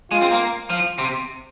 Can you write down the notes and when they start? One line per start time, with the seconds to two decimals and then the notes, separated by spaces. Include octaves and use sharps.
0.12 G#3 F4
0.22 C4
0.31 A#3
0.70 F3
0.98 C3